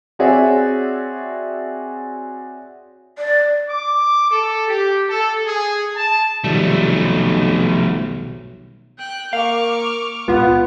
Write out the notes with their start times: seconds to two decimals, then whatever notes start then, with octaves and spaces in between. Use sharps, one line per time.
0.19 C4 F#4 G#4 C#5 D5 E5
3.18 D5
3.68 D6
4.31 A4
4.66 G4
5.08 A4
5.46 G#4
5.95 A5
6.44 B1 B2 D#3 F3 G3 A3
8.98 G5 F#6
9.33 A#3 F5 C#6 D6 F6
10.28 C#2 A#2 B3 F4